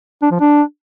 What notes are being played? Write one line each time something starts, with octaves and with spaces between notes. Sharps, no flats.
D4
F3
D4